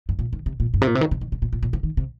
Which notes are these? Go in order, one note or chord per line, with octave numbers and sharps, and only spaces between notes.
G2
A#2
D#3
C3
A#2
G2
C3
A#2
C3
D#3
C3
D#3
C3
A#2
A#2
A#2
C3
D#3
C3